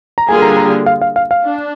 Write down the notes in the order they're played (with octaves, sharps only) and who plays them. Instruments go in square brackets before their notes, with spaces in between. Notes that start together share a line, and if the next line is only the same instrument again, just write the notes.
[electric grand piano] A#5
[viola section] D3 G3 A#3 F4 G#4 [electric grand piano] G#5
[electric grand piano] A#5
A#5
F5
F5
F5
F5
[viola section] D4